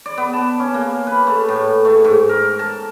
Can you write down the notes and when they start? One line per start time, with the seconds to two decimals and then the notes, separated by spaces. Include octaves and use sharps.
0.06 D5
0.17 B3
0.33 A5
0.60 C#4
0.74 A#3
1.07 B4
1.27 A3
1.49 A2
1.85 A3
2.04 G#2
2.29 A#4
2.59 A5